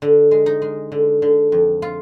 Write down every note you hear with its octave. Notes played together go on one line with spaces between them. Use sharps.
D3
G#3
D#4
G#3
D3
D3
F2
F4